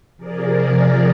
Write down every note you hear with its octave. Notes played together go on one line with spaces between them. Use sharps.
C3 F3 G#4 A#4 D5